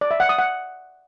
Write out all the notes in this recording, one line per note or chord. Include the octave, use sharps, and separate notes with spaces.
D5
E5
F#5
D#6
F#5